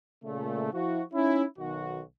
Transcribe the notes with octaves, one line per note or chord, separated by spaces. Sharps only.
A#2 C#3 A3
F3 E4 F#4
C#4 D#4 E4
B1 D#3 F#4